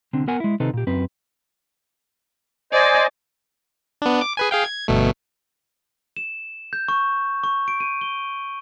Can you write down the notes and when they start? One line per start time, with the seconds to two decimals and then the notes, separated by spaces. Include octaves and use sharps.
0.13 C2 D3 C4
0.27 B3 A#4 F#5 G#5
0.40 G#3 E4
0.60 C3 D#3 C4 D#4 A4 B4
0.74 A#2 G4
0.87 F#2 C4 B4
2.73 C5 D5 D#5 G#5
4.02 B3 D4
4.21 D6
4.37 G#4 B4 G#5
4.51 G#4 F5 G5
4.65 G#6
4.88 G1 B2 A3
6.16 E7
6.73 G6
6.88 C#6
7.43 C#6
7.68 D7
7.80 D#7
8.01 G7